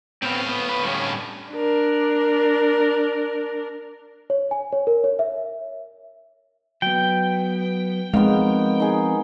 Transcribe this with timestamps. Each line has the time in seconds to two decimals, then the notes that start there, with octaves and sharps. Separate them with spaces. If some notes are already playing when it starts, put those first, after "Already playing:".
0.22 A2 B3 C4 F5
0.49 B3
0.69 B4
0.83 D3 G3 C#4
1.52 D4 A#4
4.30 C#5
4.51 G#5
4.72 C#5
4.87 A#4
5.04 C#5
5.19 E5
6.82 F#3 B3 G5
8.14 D#3 F3 G#3 B3 C4 F5
8.80 D#4 G#4